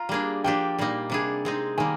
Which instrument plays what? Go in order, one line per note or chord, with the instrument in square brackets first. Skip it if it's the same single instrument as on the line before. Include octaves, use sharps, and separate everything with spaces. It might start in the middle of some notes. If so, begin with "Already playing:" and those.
Already playing: [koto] F4 [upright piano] A#5
[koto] G3 A#3 D4 G#4
[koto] F3 A#3 D4 G4 [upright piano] G5
[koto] A#2 G3 A#3 D#4
C3 G3 D4 G#4
G#3 C4 D#4
[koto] D#3 G3 A#3 [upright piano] G#5